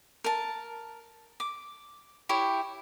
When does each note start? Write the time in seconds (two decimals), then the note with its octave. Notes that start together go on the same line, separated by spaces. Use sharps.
0.24 A#4 A5
1.40 D6
2.29 E4 G4 C#5